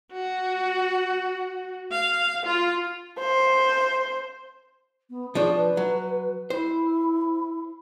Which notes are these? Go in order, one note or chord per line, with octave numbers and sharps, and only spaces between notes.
F#4
F5
F4
C5
B3
F3 D4 G#4 C#5
B4
F#3
E4 C5